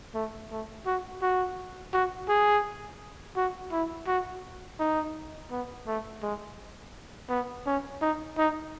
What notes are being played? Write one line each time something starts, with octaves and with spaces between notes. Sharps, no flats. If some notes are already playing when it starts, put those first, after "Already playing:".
A3
A3
F#4
F#4
F#4
G#4
F#4
E4
F#4
D#4
B3
A3
G#3
B3
C#4
D#4
D#4